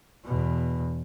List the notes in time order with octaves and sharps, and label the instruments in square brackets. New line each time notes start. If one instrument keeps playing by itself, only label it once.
[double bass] E2 B2